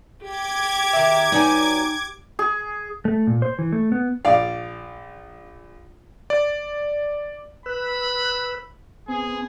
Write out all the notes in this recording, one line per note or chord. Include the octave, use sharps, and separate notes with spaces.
G4 D6 G#6
D#3 E5
F#3 B3 D#4 D5 G#5
G#4
A3
A#2
C5
E3
A3
B3
A#1 D5 F5
D5
B4 B5 E6 F#6
B3 C4 G#4 G#5